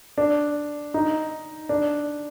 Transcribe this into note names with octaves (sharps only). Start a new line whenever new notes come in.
D4
D#4
D4